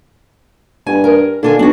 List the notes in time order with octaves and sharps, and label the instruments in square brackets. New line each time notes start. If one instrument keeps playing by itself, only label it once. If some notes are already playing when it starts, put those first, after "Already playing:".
[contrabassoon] G2 [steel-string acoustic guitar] G#5
[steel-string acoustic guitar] A#4
[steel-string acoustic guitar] A#2 D4 G#5 [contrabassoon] D3
[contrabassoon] B1 [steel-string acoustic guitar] D4 F#4